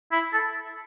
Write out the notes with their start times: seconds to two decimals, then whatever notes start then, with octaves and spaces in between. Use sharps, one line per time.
0.12 E4
0.33 A4